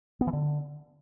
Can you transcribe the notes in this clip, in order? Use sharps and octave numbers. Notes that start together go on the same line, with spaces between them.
B3
E3
D3